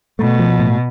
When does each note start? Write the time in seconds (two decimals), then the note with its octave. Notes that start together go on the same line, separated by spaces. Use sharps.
0.19 B2 A3
0.39 F3
0.59 A2